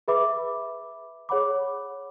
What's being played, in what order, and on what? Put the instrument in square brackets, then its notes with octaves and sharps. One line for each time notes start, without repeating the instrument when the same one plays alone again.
[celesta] G#4 B4 E5 B5 D6
G#4 C#5 F#5 B5 D6